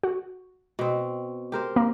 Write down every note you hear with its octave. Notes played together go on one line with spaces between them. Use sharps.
F#4
B2 C4
G4 A#4 C5
A#3